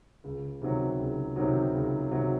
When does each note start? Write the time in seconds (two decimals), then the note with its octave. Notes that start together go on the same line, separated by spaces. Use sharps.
0.24 C#2
0.62 C3 D#3 F#3
0.99 C#2
1.36 C3 D#3 F#3
1.74 C#2
2.11 C3 D#3 F#3